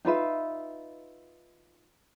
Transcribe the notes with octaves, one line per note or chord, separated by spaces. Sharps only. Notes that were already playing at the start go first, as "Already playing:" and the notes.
D#4 F4 B4 E5